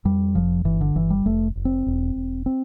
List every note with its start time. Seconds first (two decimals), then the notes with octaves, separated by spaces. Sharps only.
0.05 F2 G3
0.35 F1 F3
0.65 G1 E3
0.81 D3
0.95 G1 E3
1.10 G3
1.26 F1 A3
1.56 F1
1.65 C4
1.86 E1
2.16 E1
2.46 C4